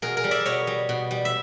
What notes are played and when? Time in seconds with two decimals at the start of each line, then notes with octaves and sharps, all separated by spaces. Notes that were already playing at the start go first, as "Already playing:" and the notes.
0.02 B2 G#4 A#4
0.17 G#4 A#4
0.24 G3
0.31 D5 E5
0.45 B2 C#5 D#5
0.67 G3
0.89 B2
1.11 G3
1.25 E5